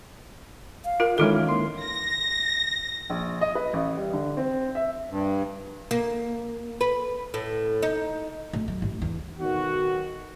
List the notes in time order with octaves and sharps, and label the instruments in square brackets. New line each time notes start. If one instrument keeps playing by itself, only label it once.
[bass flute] F5
[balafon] F4 A#4
[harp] D#3 E3 C#4 [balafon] G#3 F4 A4 [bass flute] D#4
[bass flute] A#3 [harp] C6
[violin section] A#6
[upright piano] A#1
D#5
B4
A1
G3
D3
C4
E5
[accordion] G2
[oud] A#3
B4
A2
D#4
[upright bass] D1
F#3
A1
E2
[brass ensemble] B1 D#3 F#4